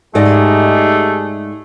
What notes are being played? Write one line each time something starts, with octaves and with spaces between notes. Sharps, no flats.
G#2 A3 D#4 G4 G#4 D5 D#5